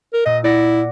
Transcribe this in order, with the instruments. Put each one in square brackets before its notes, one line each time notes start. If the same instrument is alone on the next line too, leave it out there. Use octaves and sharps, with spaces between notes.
[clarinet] A#4
[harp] A#2 [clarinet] D#5
[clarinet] E4 [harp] D5 F#5 A#6